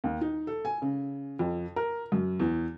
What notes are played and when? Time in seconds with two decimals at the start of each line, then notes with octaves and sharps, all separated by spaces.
0.04 D#2
0.21 D#4
0.47 A4
0.65 G#5
0.82 C#3
1.39 F2
1.76 A#4
2.12 F#2
2.40 E2